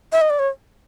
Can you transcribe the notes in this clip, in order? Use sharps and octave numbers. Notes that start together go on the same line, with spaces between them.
E5
D#5
D5
C#5